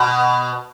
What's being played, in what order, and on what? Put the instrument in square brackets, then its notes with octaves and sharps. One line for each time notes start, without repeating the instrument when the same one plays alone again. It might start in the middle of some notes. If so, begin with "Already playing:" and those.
Already playing: [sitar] B2